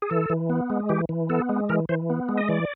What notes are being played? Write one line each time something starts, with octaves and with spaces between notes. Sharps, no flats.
G#4
E3 A4
E3
B3
G#3
E3 G4
E3
B3 A4
G#3
E3 A#4
E3 C5
B3
G#3
D#5
E3 D5